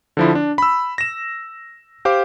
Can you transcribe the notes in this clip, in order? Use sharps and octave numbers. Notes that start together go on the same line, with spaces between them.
D3 F3 E4
D4
B5 E6
A#6 E7
G4 C5 F5 D6